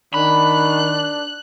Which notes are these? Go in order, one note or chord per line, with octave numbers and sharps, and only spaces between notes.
D#3 D4 B5 F#6